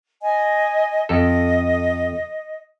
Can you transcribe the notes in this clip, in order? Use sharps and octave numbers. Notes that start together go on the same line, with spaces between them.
D#5 G#5
F2 A4 D#5